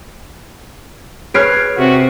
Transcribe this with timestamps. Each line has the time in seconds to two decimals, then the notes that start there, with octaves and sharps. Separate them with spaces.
1.34 G#4 B4 C#5 F6 C7 D7
1.77 C3 F#4